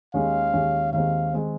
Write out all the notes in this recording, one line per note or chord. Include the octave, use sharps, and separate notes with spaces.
D#2 D#3 G#3 C#4 F5
D#2 D#3 G#3 C#4
D#2 D#3 G#3 C4 F5
D#3 G#3 C4